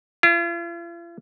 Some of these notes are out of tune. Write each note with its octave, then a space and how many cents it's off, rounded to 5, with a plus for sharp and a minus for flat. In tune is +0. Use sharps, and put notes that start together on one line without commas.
F4 -45